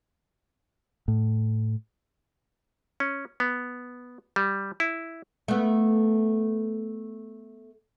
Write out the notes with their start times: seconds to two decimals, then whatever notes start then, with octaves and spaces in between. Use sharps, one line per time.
1.08 A2
3.00 C#4
3.40 B3
4.36 G3
4.80 E4
5.48 A3 B3